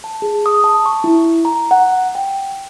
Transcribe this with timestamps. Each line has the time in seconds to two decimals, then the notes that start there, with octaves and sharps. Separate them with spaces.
0.04 A5
0.22 G#4
0.46 D#6
0.64 A5
0.86 C#6
1.04 E4
1.45 A#5
1.71 F#5
2.15 G5